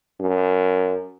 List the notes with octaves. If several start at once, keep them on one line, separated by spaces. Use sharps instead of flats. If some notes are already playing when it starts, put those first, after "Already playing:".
F#2